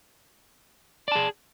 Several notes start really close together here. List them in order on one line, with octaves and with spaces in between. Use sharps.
D5 A5 G#4